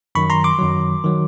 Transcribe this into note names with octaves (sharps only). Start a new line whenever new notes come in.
F#2 D#3 F#3 B5 C#6
A#5 C6
C6 D6
F#2 D#3 F#3
D#3 F#3